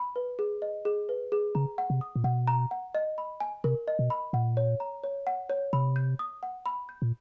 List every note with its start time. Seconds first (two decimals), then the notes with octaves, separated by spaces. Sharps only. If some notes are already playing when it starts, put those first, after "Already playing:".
Already playing: B5
0.16 B4
0.39 G#4
0.62 D#5
0.85 G#4
1.09 B4
1.32 G#4
1.55 C#3 A#5
1.78 F#5
1.90 C3
2.01 D#6
2.16 A#2
2.24 B2 F#5
2.47 A#5
2.71 F#5
2.95 D#5
3.18 B5
3.40 G#5
3.64 C3 A#4
3.88 D#5
3.99 B2
4.10 B5
4.33 A#2 F#5
4.57 C#5
4.80 A#5
5.04 C#5
5.27 F#5
5.50 C#5
5.73 C3 B5
5.96 G6
6.19 D#6
6.43 F#5
6.66 B5
6.89 G6
7.02 A#2